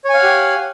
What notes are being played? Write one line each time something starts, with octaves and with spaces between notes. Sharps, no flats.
G4 C#5 F5 F#5 G#5